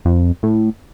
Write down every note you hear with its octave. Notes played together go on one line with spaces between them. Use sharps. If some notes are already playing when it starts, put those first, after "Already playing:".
F2
A2